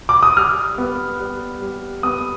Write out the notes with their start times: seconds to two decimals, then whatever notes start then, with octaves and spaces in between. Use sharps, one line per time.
0.09 D6
0.23 D#6
0.37 G3 F6
0.78 B3
1.20 G3
1.62 G3
2.03 B3 D#6